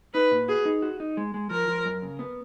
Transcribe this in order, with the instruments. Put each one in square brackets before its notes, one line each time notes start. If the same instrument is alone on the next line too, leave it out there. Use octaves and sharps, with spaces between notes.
[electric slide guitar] D#4 [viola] B4
[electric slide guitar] A#2
[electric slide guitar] F#4 [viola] G#4
[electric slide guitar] D#4
F#4
D#4
G#3
G#3
[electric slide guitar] F3 [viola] A#4
[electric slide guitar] F3
F#2
C#3
B3